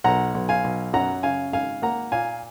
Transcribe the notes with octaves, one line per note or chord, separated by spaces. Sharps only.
B1 F#5 A#5
B1
F5 G#5
B1
F#2 F#5 A#5
C#3 F5 G#5
G#1 F5 G#5
A#3 F#5 A#5
A#2 F5 G#5